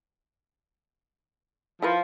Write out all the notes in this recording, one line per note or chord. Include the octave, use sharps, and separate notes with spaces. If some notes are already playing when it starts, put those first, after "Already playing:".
F3 E4 A#4 B4